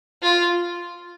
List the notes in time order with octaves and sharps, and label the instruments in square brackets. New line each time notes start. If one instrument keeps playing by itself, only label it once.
[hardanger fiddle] F4